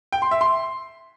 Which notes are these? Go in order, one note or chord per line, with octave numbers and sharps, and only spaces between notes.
G5
C6
E5
C6